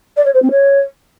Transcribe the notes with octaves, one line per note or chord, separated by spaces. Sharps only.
D5
C#5
C5
C4
C#5